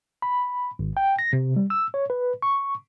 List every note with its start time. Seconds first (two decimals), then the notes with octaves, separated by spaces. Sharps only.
0.22 B5
0.79 G#1
0.97 G5
1.19 A#6
1.33 C3
1.56 G3
1.70 E6
1.94 C#5
2.10 B4
2.42 C#6